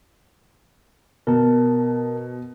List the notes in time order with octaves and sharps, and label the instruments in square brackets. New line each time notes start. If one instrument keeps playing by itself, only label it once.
[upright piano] B2 [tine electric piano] A#4 A5